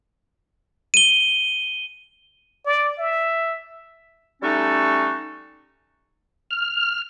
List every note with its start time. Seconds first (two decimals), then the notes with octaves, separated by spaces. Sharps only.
0.94 D#7 G7
2.66 D5
2.99 E5
4.42 G3 A3 C#4 D#4 F#4 A4
6.51 F6